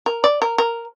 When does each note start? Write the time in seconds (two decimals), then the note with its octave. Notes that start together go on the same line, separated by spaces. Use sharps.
0.06 A#4
0.24 D5
0.42 A#4
0.58 A#4